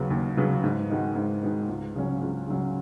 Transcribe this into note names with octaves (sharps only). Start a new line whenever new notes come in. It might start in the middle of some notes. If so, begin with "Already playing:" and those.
Already playing: D#2 C#3 F#3 B3
D#2
C#3 F#3 B3
G#2
D#3 G#3 B3 F#4
G#2
D#3 G#3 B3 F#4
C#2
C#3 F#3 C#4
C#2
C#3 F#3 C#4